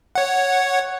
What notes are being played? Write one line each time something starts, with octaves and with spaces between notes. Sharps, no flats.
C#5 F#5